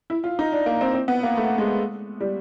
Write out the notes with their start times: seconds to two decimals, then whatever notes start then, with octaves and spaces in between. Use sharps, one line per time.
0.10 E4
0.24 F4
0.39 D#4
0.52 D4
0.66 A#3
0.81 C4
0.94 C4
1.08 B3
1.23 A#3
1.37 A3
1.58 G#3
2.20 G3